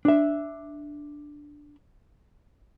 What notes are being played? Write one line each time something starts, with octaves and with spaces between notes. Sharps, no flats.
D4 E5